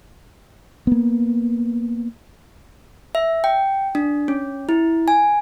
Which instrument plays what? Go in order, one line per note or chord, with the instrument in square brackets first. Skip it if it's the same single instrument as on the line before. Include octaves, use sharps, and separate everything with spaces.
[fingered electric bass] A#3 B3
[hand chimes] E5
G5
D4
C#4
E4
G#5